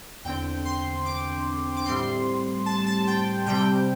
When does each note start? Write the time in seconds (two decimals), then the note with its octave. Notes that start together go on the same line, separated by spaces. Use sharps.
0.24 E2 D3 C4 G5
0.65 C6
1.05 D6
1.77 D6
1.85 A2 G3 C4 C6
2.66 A5
2.87 A5
3.07 G5
3.46 C3 G3 C4 G5